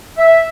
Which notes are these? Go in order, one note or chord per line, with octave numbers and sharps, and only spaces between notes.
E5